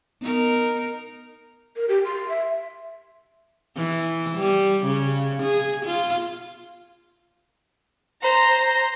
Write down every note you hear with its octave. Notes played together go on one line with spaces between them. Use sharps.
B3 D#4 A#4
A#4
G4
C6
E5
E3
G3
C#3
G#4
F4
C5 A#5